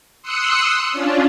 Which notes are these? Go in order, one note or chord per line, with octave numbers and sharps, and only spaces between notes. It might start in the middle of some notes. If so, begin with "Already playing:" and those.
C6 D#6 E6 F#6 C#7
C#4 D4 F4